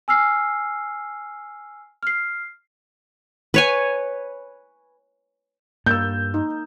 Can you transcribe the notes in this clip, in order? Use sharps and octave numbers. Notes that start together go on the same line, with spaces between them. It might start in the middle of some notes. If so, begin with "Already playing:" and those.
G#5 E6 F6 C7
F6 C7
B4 C#5 G#5
G2 A#3 E6 G6
D#4